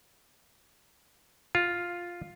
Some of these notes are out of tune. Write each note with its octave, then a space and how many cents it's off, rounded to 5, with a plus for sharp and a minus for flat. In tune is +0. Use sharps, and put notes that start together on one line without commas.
F4 +5